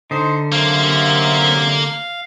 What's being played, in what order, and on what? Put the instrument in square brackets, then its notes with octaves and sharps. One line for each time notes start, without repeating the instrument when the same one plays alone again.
[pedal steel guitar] D3 [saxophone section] D#4 C5
[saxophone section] F#2 C3 [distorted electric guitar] A#3 [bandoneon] F5